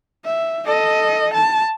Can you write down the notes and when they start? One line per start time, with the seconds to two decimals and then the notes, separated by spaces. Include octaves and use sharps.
0.25 E5
0.66 A4 D#5
1.34 A5